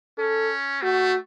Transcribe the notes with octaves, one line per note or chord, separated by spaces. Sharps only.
C#4 A4
A3 F#4